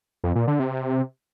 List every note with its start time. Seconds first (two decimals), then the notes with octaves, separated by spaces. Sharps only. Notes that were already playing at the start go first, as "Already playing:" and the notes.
0.24 F2
0.36 A#2
0.48 D3
0.59 C3